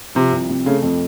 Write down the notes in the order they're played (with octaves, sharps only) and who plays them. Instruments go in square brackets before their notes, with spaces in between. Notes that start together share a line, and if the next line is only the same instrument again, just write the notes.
[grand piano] C3 [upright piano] F3
[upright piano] C2
C3
[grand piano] C#3 [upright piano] A3
[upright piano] F2